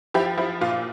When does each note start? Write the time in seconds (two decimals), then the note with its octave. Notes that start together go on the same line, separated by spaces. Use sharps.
0.14 F3 E4 G4
0.37 F3 E4
0.61 A#2 F4